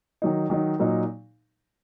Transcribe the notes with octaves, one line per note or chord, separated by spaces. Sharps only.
D#3 F#3 D#4
D#3 F#3 D#4
A#2 F#3 D#4